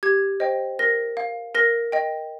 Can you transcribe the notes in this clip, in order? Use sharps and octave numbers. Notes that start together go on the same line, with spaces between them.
G4 G#6
C5 D#5 G5
A#4 A#6
F5
A#4 A#6
D#5 G5